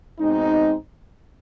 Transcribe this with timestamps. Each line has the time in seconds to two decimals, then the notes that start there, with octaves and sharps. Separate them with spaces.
0.19 B2 G#3 C4 D#4